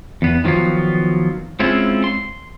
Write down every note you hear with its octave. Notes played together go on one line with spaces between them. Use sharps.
E2 B3
D#3 F3 F#3 B3 F4
G#3 C4 C#4 E4 F4
C6